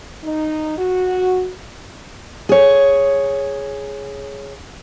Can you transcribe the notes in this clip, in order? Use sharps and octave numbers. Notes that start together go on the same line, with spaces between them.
D#4
F#4
G#4 C#5